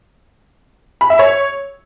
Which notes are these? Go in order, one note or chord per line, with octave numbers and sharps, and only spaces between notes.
B5
E5
C#5